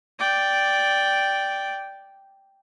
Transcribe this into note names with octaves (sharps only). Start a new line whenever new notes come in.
D5 G5